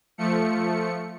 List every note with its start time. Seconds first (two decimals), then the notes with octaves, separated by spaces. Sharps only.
0.18 F3 A3 C#7